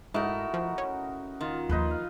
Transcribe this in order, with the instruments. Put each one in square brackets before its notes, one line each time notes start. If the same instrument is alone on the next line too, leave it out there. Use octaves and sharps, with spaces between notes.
[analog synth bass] G#2 [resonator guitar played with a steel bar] A3 E4 [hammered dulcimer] D#4 F#4 A#4
[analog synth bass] F3
C#4
[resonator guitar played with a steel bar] D#3 [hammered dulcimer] F4
[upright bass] D#2 F3 [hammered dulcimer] D#4 B4 C6
[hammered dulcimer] F5